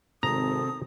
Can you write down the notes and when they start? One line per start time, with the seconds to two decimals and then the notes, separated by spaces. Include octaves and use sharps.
0.23 G#1 C3 C4 A4 A#5 D#6